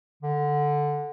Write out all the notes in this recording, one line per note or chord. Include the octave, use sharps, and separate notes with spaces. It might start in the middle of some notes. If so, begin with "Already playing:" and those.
D3